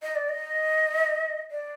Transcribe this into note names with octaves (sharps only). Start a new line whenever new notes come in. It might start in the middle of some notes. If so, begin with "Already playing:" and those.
D#5
D5
D#5
D5